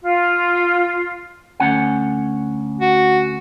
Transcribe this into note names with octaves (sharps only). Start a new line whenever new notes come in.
F4
D2 C#4 F#5
F#4